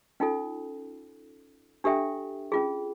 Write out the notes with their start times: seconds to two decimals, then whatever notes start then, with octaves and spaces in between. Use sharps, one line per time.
0.20 C#4 D#4 F4 A4
1.84 D4 G4 A4 E5 G5
2.52 C#4 F4 G#4